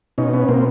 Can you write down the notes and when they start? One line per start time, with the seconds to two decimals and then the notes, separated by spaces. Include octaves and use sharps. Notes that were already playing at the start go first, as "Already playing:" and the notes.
0.18 B2 C#4 D#4
0.33 B3 C#4
0.48 B2 A#3 C4